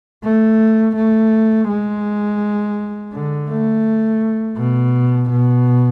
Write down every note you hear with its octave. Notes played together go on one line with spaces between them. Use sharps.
A3
A3
G#3
D3
A3
B2
B2